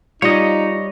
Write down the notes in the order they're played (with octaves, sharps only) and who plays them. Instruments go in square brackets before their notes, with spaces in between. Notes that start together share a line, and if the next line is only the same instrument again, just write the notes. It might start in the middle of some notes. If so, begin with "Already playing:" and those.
[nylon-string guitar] G3 [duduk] D#4 [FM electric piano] F4 [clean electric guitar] C#5 D#5